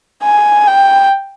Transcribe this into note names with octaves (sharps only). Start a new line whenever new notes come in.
G#5
G5